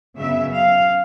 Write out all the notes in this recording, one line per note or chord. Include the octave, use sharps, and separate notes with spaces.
F#2 C#3 F#3 B3 E5
F5